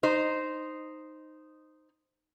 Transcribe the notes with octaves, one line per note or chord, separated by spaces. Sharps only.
D#4 C5